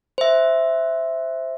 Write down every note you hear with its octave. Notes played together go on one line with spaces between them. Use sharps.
C5 E5